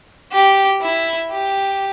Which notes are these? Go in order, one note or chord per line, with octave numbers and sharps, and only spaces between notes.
G4
E4
G4